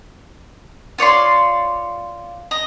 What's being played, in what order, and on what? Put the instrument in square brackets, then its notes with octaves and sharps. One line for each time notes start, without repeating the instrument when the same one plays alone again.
[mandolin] F4 C#5 D5 C6
D#5